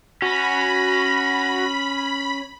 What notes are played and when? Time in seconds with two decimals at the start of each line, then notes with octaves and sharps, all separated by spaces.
0.22 C#4 F#4 B5 A#6